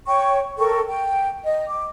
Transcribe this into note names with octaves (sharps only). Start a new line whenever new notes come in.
C#5 G5 C#6
A4 A#4 G5 C#6
G5
D#5
D6